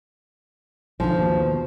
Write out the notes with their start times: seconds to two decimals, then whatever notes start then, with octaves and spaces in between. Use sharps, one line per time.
1.00 B1 G#2 D3 F3
1.16 D#2 B2